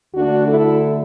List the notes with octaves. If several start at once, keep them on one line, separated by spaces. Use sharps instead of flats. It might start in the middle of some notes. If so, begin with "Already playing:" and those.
D2 D3 A3 D4 F#4
E4 A4